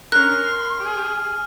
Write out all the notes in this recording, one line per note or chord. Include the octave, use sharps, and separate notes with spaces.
C#4 A#4 C6 F6 F#6
G#4